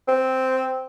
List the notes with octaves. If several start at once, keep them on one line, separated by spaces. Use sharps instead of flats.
C4